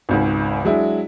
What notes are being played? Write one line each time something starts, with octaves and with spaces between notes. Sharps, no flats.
G#1 C#2 G#2
F#3 G#3 D4 E4